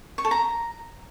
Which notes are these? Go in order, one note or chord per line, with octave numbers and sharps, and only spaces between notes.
C#6
A4
A#5